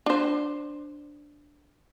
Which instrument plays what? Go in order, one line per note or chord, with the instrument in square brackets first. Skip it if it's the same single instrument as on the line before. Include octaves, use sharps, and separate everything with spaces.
[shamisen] D4 C5